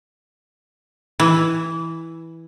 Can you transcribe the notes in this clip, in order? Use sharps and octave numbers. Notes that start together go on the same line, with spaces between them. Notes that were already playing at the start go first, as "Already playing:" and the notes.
E3